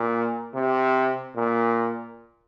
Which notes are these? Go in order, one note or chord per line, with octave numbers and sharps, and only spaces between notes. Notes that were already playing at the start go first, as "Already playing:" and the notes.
Already playing: A#2
C3
A#2